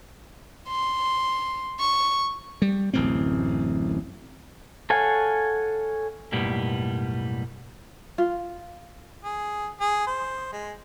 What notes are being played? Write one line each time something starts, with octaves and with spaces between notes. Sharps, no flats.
C6
C#6
G3
D1 A1 F#2 C4
A4 C#5 F5 F#5 G#5
B1 F#2 A2 G3 A#3 B3
F4
G#4
G#4
C5
G#3